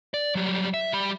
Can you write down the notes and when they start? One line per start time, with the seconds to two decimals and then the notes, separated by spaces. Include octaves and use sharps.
0.14 D5
0.35 F#3 G3
0.74 E5
0.93 G3 B5